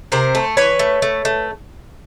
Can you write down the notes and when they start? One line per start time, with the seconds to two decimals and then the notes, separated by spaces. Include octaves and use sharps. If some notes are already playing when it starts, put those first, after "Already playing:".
0.12 C3 A#4 C5
0.35 A3
0.57 E3 B4 C#5
0.79 A3
1.02 A3
1.25 A3